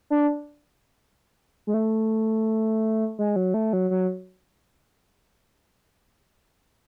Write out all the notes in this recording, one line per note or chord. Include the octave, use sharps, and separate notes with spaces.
D4
G#3
A3
G#3
F#3
A3
F#3
F#3